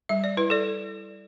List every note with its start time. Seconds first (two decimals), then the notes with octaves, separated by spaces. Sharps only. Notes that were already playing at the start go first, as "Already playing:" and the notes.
0.09 G3 E5
0.24 D5
0.37 E4 B4
0.50 A4 D5